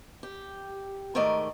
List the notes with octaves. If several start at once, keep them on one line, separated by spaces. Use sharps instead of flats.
G4
G#2 D#3 A3 A#4 D5 D#5